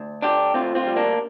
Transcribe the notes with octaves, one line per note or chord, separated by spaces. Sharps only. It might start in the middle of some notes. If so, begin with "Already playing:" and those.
Already playing: D2
D3 D4 G4
D2 C4 F4
C4 F4
G3
A#3 D4